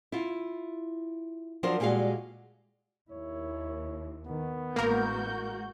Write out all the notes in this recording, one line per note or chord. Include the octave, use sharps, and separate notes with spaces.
E4 F4
F3 F#3 D4 F4 A#4 C5
A#2 G3 G#3 F#4 F5
D#2 E4 C#5
D#3 B3
A1 G#3 A#3 F#4 A#4 G6